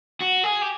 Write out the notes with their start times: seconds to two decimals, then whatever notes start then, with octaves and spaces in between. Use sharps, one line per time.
0.21 F#4
0.44 G#4
0.62 G4